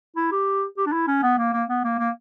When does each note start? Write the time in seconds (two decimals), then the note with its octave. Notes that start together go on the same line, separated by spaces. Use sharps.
0.16 E4
0.31 G4
0.77 G4
0.86 D4
0.92 E4
1.07 C#4
1.23 B3
1.38 A#3
1.53 A#3
1.69 B3
1.84 A#3
1.99 A#3